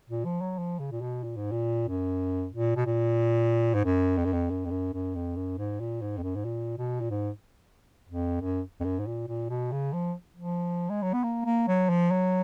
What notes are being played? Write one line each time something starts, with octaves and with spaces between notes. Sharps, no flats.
A#2
F3
F#3
F3
C#3
A#2
B2
A#2
G#2
A#2
F#2
A#2
B2
A#2
G#2
F#2
F2
F#2
F2
F#2
F2
F#2
F#2
F2
F#2
G#2
A#2
G#2
F2
F#2
G#2
A#2
B2
A#2
G#2
F2
F#2
F2
F#2
G#2
A#2
A#2
B2
C#3
F3
F3
G#3
F#3
B3
A#3
A#3
F#3
F3
F#3